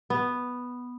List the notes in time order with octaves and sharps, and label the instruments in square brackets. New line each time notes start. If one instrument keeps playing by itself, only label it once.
[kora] B3